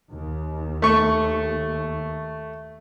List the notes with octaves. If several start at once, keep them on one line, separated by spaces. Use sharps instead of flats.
D#2
A3 C#6